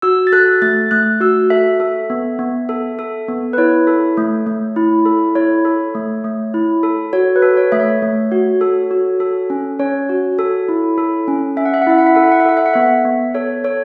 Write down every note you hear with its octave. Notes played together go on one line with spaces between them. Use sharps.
F#4 E6
A6
A4 F#6
A3 A6
A3 F#6
F#4 E6
A4 E5
A4
B3
B3
A4
A4
B3
B4
E4 C#5
A4
A3
A3
E4
A4
E4 C#5
A4
A3
A3
E4
A4
F#4 C#5
B4
A4
C#5
A3 E5
C#5
A3
F#4
A4
F#4
A4
C#4
C#4 C#5
F#4
A4
E4
A4
C#4
C#4 E5
F#5
E5
F#5
E4 E5
F#5
E5
A4 F#5
E5
F#5
E5
A4 F#5
E5
F#5
B3 E5
B3
A4 C#5
A4 C#5